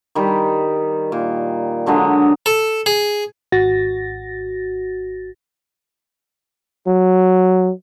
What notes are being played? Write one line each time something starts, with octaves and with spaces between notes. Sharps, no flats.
D#3 G3
A#2
D3 F#3 G#3 D4
A4
G#4
G#1 F#4 A6 A#6
F#3